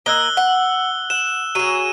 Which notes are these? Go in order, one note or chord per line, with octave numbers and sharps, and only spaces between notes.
A#3 D#5 E6 F#6 G7
F#5
F#5 E7
F#3 G#4 D#7